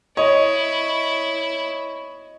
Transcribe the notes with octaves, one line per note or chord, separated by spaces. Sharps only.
E4 C#5 D#5